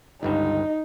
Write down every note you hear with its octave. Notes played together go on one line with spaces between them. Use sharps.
G1 C#2 G2 D#4